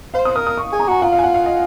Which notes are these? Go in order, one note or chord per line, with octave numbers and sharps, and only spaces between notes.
C5 F5
D#6
A#4 D#6
D#6
C#6
G#4
A#5
F#4 G#5
F4 F#5
F5
G#5
F#5
F5
D#5